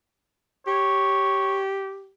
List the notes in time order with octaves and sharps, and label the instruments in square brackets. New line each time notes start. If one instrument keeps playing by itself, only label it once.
[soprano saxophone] G4 [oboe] C#5